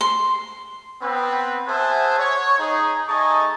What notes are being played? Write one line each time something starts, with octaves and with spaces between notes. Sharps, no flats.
C6
B3 C4 B4
G#4 C5 E5 F#5 G#5 A5
C#5
D#4 G#4
A3 D#4 G#4 D#5 A5 C#6